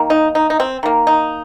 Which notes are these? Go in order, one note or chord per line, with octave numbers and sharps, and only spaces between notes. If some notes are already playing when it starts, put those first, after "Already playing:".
Already playing: D#3 A#3
D#4
D#4
D#4
C4
D#3 A#3
D#4